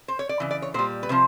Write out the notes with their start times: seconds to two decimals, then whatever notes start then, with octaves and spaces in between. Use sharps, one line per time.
0.08 C5
0.19 C#5
0.29 D5
0.40 C#3 E3
0.51 D5
0.62 C#5
0.74 A#2 G3 C5
1.03 B4
1.09 C3 F3 C5